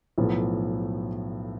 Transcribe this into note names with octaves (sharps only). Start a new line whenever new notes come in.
B1 A2 F3 B3